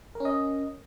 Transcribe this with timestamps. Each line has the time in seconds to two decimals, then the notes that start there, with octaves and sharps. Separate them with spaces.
0.15 A#4
0.20 C#4
0.25 D#5